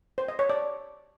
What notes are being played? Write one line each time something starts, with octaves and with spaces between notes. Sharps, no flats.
C5
D#5
C#5
D5